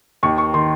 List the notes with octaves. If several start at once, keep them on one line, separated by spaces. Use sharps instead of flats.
D#2 D#3 C#6
C#6
D#3 C6